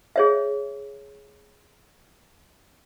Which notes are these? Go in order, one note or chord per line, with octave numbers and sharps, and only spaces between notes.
G#4 C#5 E5